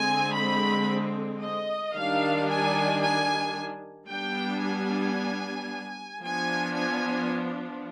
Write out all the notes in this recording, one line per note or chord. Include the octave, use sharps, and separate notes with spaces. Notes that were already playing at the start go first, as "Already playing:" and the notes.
Already playing: D3 G#3 C4 G#5
B5
D#5
D#3 G3 D4 F5
G#5
G#5
G3 B3 D4 G5
G#5
F3 B3 D4 G#5
G#5